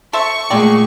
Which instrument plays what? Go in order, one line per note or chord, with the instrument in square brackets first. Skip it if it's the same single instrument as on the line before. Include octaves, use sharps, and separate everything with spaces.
[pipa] A4 C5 E5 [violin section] C#6
[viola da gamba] A#2 A3 [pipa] D3 D#4 D5 [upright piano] G#3 G5